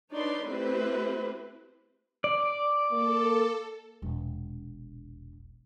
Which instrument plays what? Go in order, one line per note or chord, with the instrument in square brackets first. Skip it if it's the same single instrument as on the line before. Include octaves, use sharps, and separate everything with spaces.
[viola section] D4 D#4 B4 C#5 D5 C6
A3 C4 E4 G4 B4 C5
[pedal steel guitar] D5 [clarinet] D6
[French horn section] A#3 [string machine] A4
[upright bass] E1 A#1